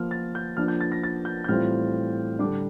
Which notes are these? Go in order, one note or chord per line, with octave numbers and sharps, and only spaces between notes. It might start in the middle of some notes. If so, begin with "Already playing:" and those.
Already playing: F3 A#3 F4 F6
A6
G6
F3 A#3 D4 F6
G6
A6
A#6
A6
G6
G6
A2 E3 G3 C4 F4 F6
D3 G3 D4 D6